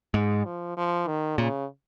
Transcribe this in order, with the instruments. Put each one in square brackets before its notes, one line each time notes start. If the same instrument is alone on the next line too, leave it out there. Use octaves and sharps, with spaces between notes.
[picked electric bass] G#2 [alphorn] G#3
[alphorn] F3
F3
D#3
[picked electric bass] A#2 [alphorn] C#3